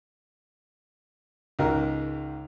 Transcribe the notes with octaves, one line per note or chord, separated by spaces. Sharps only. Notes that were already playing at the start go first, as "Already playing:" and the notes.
C#2 G#2 A#4